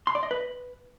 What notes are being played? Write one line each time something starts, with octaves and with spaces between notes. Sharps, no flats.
C6
D5
D#5
B4